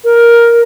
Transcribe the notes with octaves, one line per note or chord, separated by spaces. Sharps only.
A#4